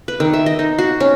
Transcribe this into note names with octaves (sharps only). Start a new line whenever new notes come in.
B4
D#3
E5
D#5
D#4
F#4
C#4